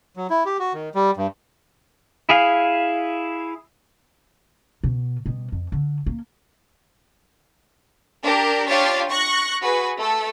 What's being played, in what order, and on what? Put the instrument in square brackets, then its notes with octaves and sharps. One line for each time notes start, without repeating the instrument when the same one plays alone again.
[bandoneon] F#3
E4
G4
F#4
D#3
G3
G2
[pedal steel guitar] E4 G#4 F5
[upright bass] B2
B2 G3
F2
D3
A#3
[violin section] D4 G4 A#4
D4 F4 G4 C#5 F5 A6
C#6 F#6 A#6
F#4 G#4 B4
A3 A4